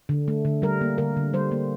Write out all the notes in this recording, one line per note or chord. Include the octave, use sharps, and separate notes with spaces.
D3
A3
D3
G3 A#4
A#3
D3 A#4
D3
G3 C5
A#3